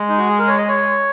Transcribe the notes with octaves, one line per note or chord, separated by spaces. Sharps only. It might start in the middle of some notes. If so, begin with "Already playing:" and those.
Already playing: G#3
D#4
F#4
G#4
A#4
C#5
D#5
C#5